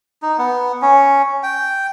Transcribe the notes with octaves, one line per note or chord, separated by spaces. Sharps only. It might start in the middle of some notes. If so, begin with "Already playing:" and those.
D#4
B3
C#4
G5